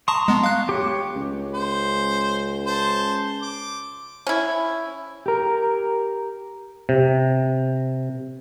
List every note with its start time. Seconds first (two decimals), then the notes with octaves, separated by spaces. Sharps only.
0.08 A5 A#5 C6 C#6 D#6
0.28 G#3 B3
0.44 F5 F#6
0.69 G4 C#5
1.15 C#2
1.54 C5
2.66 C5 A5
3.42 D6
4.27 C#4 E4
5.26 G4 A#4
6.89 C3